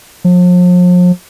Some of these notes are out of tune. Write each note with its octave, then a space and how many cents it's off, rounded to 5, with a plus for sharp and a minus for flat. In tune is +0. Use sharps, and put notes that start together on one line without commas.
F3 +40